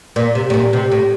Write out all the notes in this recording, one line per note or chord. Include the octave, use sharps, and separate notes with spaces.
A#2
C3
A2
A#2
C3
A2